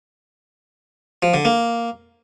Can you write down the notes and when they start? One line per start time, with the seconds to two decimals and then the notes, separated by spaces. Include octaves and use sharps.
1.23 F3
1.34 D3
1.45 A#3